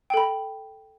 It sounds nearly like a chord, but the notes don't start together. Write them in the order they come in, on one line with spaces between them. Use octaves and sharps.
G5 A4 B5